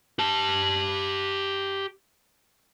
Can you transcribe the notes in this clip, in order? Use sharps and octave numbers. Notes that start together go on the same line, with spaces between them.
G4 A5